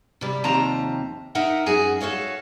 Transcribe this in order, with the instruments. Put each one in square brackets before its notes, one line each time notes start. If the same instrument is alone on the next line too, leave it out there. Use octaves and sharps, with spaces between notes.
[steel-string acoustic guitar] C3 G3
D#2 C3 F3 C4 A5 A#5
D#4 A#4 E5 F#5
F#2 F#4 G#4
F#4 A4 C#5 F5